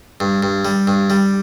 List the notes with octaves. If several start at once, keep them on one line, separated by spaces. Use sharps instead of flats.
G2
G2
G3
G2
G3